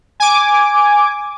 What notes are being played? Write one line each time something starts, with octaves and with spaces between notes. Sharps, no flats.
G#5 D6